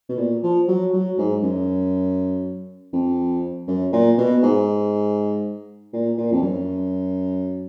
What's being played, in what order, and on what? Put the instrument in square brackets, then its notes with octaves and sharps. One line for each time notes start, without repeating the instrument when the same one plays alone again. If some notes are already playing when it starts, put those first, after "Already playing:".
[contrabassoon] B2
A#2
F3
F#3
F#3
G#2
F#2
F2
F#2
A#2
B2
G#2
A#2
A#2
F2
F#2